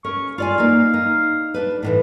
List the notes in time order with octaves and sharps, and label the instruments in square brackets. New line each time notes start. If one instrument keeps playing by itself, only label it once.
[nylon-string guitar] C#4 A#4 [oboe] C#6
[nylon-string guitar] F4 D5 G#5 [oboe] F5
[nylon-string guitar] A#3 D#4
D#4
D4 B4
A2 D#3 E3